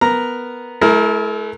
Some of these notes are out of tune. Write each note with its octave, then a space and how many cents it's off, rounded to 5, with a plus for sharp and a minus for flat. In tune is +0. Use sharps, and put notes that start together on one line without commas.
B3 +0 A#4 +0 A#5 +0
A3 -45 E4 +0 A#4 +0